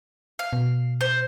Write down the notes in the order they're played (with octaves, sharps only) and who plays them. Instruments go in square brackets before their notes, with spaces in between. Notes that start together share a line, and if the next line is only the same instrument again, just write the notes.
[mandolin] F5
[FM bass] B2
[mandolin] C5